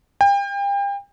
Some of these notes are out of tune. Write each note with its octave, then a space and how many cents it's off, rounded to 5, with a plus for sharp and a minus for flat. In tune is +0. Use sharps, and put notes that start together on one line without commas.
G5 +35